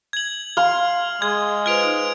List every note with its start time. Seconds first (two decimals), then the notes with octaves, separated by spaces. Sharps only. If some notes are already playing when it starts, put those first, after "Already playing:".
0.13 G#6 F#7
0.57 F5 C6 F6
1.22 G#3 G#4 G#6
1.66 F4 B4 C5 G#6 D7 F7
1.84 D#4